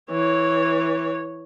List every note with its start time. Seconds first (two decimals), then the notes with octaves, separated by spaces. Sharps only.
0.10 E3 C#5